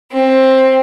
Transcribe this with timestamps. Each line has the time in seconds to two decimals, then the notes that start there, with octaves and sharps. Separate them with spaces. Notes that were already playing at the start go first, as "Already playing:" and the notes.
0.12 C4